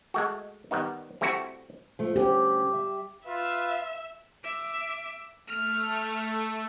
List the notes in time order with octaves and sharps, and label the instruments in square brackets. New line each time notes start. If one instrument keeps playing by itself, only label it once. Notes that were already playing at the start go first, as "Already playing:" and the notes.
[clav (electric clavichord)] G#3 A3 F#4
D#3 G3 B3 D#4
G3 A3 C4 E4 F#4
[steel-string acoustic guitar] F3 A3
[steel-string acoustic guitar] D2 C#4 [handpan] G4
[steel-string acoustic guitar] E5
[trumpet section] F4 B4 F5 [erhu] E5
[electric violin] E5 D6
[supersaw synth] A3 [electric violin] F6